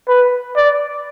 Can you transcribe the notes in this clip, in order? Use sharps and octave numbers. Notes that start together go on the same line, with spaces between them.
B4
D5